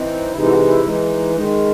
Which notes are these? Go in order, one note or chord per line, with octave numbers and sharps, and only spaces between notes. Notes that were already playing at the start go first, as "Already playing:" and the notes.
Already playing: E3 C4 D#4
C3 E3 G#3 D#4 E4
E4
F#4
E4
E3 G#3 D#4
D#3 G#3 D#4